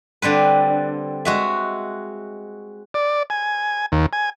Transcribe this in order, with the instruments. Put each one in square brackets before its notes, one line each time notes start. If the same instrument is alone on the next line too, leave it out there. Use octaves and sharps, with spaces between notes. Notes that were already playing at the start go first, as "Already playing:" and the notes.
[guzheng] D3 G3 C4 B4
G#3 F#4 E5
[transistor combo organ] D5
G#5
D#2
G#5